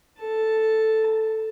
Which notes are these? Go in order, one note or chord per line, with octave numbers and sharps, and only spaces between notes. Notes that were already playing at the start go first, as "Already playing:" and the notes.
A4 A5